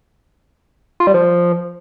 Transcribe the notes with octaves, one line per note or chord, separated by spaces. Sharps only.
F4
G3
F3